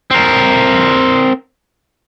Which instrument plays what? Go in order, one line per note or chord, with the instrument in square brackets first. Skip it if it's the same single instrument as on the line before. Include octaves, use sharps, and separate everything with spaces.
[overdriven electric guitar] C4 A#4